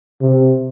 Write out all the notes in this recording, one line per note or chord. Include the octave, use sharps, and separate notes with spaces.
C3